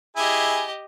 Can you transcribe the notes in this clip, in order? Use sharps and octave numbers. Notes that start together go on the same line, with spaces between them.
E4 G4 G#4 D#5 G#5